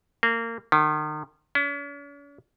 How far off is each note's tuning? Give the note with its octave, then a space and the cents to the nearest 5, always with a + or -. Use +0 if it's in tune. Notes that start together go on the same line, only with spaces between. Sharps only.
A#3 -25
D#3 -35
C#4 +45